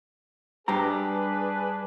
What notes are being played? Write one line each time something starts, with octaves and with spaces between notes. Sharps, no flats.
G2 D4 G4 G#4 B4 A#5